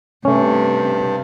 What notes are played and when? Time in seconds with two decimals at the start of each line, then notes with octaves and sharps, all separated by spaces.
0.25 G2 C3 A3 C#4